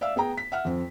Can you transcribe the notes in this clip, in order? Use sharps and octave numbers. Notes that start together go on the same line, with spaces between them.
D5 E5 F5 E6
B3 G#4 G5 A#5
B6
E5 F#5 F6
F2 C4